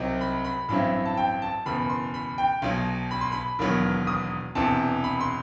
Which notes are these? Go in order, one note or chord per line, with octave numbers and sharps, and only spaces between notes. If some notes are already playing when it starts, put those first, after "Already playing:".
Already playing: C2 C3 F#3 C4 D#4
B5
B5
A1 G2 F#3 C4 E4 B5
A5
G5
A5
F#1 E2 B2 B5
C6
B5
G5
B1 B2 F#3
B5
C6
B5
E1 D#2 D#3 F#3 B3
D#6
E1 E2 C3 A5
B5
C6